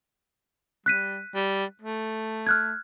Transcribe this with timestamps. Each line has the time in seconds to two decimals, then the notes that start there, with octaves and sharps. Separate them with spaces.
0.86 G3 F#6 B6 D#7
1.35 G3
1.82 A3
2.47 F6 F#6 G#6